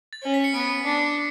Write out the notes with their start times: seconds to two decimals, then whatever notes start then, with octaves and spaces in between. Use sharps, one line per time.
0.13 A6
0.23 C#4
0.34 B6
0.44 C#7
0.54 B3 D7
0.85 D4